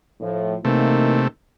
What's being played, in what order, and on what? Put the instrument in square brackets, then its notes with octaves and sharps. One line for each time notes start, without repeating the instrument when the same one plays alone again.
[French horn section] A2 F3
[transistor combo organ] C3 A3 [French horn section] E3 A#3 D#4